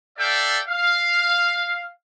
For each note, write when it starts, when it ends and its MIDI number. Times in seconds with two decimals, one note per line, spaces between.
0.19 0.59 69
0.19 0.59 74
0.19 0.59 76
0.19 0.59 77
0.19 0.59 79
0.67 1.89 77